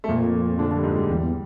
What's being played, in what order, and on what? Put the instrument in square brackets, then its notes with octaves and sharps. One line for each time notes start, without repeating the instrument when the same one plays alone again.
[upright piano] A3
[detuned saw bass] F2 [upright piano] A#2 A#3
[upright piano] D3 D4
D3 D4
G3
G#2 G#3
G3
[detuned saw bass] E2 [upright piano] G3